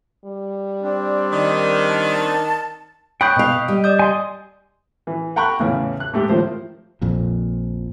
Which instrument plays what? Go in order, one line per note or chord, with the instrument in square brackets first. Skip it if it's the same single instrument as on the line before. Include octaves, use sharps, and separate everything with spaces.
[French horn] G3
[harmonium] C4 D4
[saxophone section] D#3
[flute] A5
[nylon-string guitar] C#5 [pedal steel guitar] G5 B5 G6 [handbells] C#6 D#6 F#6
[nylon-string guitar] B2 F5
G3 D#5
[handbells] D5 D#6 G6
[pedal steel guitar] G#5 C6
[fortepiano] E3
F#5 G5 A#5 B5 C#6 F#6
E2 A2 C#3 E3
F#6
G#2 A3 G4
A2 D#3 F3 C5
[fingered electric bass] A#1 F2 A#2